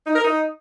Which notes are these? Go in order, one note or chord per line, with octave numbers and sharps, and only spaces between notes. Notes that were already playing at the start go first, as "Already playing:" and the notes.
D#4
A#4
D#4